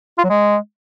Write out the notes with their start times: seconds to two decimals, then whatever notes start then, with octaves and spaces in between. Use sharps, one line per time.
0.18 F4
0.24 F#3
0.30 G#3